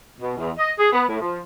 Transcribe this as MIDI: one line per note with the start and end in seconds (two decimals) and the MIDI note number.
0.21 0.35 47
0.38 0.50 40
0.58 0.71 75
0.78 0.92 68
0.93 1.04 59
1.08 1.20 45
1.20 1.41 53